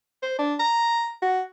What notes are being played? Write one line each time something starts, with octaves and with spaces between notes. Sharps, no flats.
C5
D4
A#5
F#4